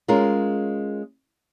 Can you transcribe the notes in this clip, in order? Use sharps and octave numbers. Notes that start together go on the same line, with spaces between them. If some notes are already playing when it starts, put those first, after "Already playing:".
G#3 C#4 F4 A#4